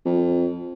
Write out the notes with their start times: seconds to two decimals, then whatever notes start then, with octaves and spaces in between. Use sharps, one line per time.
0.05 F2